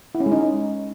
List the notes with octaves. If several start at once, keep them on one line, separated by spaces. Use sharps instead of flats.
E4
C#4
G#3
D#4